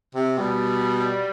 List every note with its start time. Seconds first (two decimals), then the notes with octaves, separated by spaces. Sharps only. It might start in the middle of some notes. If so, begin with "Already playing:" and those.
0.15 C3
0.38 B2 G3